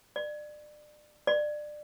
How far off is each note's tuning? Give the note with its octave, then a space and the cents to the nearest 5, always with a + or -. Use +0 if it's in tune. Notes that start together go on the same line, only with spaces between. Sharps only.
D5 +30
D5 +25